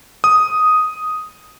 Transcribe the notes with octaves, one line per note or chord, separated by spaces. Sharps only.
D#6